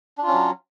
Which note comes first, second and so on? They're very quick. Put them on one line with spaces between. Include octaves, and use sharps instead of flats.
D4 F4 C#4 F#3